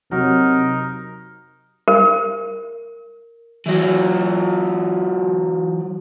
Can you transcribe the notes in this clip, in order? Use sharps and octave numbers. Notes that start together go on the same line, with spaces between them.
C3 F#3 D#4 A#4
A#4
E3 F#3